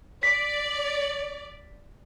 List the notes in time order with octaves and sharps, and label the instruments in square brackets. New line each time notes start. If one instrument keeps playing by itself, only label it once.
[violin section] D5 [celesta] B6